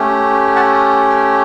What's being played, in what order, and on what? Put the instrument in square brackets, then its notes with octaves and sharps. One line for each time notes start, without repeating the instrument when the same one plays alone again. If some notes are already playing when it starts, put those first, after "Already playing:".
Already playing: [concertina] A3 C#4 G4
F#5 A5